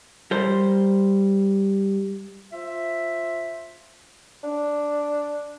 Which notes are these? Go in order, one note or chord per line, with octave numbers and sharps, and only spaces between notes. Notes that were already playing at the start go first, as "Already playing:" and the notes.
G3 A#4 C5
F4 C5 E5
D4